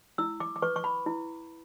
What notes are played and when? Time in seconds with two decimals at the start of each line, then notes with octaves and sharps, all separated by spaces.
0.18 E4 E6
0.40 D6
0.56 D6
0.62 B4 C#6
0.76 C#6
0.84 B5
1.06 E4